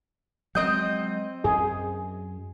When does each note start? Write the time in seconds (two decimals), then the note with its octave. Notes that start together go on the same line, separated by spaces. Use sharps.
0.55 F#3 G#3 C4 D#5 G6
1.44 F#2 G#4